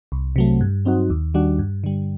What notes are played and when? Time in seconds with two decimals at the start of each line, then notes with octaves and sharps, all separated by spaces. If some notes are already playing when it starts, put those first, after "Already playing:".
0.12 C2
0.36 C3 F#3 A3
0.61 G2
0.85 F#3 C4 D#4 F#4
1.10 D#2
1.34 D#3 G3 D4 F#4
1.59 G2
1.84 D3 G3